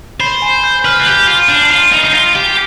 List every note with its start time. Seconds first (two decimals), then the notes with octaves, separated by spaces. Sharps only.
0.20 C5 B5
0.42 G#5
0.64 G6
0.85 B4 F6
0.99 F4
1.06 G4 G6
1.27 F4 F6
1.49 D4
1.71 F4
1.92 D#4
2.04 D#4
2.13 F4
2.35 G4